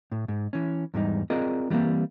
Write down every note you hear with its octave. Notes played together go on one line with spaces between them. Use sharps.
A2
G#2
E3 C#4
E2 G#2 G3 D#4
C4 F4 G#4 A#4 D5 D#5
E3 G3 A3 A#3 C4